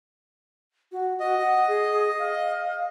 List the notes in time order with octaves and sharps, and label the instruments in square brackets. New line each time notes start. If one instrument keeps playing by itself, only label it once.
[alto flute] F#4
[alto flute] F#4 [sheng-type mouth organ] D#5
[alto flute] F#5
G#4
F5